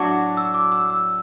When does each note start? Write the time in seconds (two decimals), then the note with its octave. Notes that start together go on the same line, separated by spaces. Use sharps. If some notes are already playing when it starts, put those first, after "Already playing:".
Already playing: A2 F#3 D4 F#4 D6
0.37 E6
0.54 D6
0.72 E6
0.90 E6